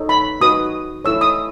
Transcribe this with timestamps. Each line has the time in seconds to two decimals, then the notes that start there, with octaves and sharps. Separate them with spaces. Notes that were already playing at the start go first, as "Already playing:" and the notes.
Already playing: D#4 A4 C#5
0.09 B5
0.41 D#4 F#4 B4 D#6
1.05 E4 A4 C#5 E6
1.21 D#6